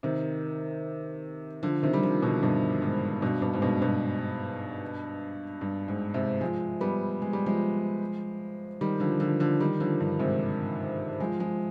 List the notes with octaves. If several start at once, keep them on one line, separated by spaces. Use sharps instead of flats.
C3 D#3
D3 F3
C3 D#3
G3
D3 F3
B2 D3
G2 B2
G#2
G2 B2
G2 B2
G#2
G2 B2
G2 B2
G2
G#2
G#2 C3
F3 G#3
G3 B3
G#3
G3
F3 G#3
D#3 G3
D3 F3
D3 F3
D3 F3
D#3 G3
D3 F3
G2
G#2 C3
F3 G#3
F3 G#3